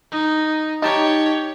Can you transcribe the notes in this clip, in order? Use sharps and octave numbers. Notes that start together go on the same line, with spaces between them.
D#4
D#4 G4 C#5 A5